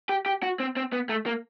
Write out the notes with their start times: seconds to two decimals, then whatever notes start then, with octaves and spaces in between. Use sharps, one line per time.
0.09 G4
0.26 G4
0.43 F#4
0.60 C4
0.77 C4
0.93 B3
1.09 A3
1.26 A#3